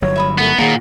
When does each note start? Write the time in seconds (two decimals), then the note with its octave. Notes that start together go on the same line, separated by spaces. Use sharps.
0.02 G1 F#3 C#5
0.16 E5 B5 D#6
0.38 A3 B3 D#4 E4 A#4
0.59 A#2 D#3 A#3 F#4 G#4 G#5